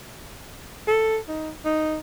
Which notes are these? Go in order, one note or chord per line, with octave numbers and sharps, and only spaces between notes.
A4
D#4
D#4